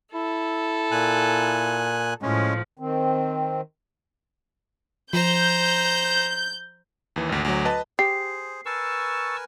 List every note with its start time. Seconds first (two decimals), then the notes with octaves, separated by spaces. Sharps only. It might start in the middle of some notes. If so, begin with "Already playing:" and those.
0.14 E4 A4
0.92 A#2 G#5 F#6
2.22 A2 F3 G#3 C#4
2.79 D#3 C4
5.13 F3 C5 A#5 G6
7.16 D#2 E3
7.29 G#1 D2
7.45 D2 F#3
7.65 B4 D#5 A5
7.99 G4 G#4 C5 C7
8.65 A#4 B4 G#5 A5 C#6 E6